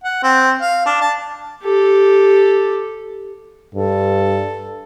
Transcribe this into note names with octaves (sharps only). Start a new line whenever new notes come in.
F#5
C4
F5
D4
A5
G4 A4
G2 A4